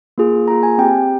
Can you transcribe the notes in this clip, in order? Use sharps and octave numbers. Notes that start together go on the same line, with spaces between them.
A#3 F4 G#4
A#3 F4 G#4 A#5
G#5
C4 G4 G5